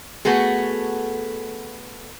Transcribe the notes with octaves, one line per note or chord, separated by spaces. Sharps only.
A3 B3 F#4 G#4 A4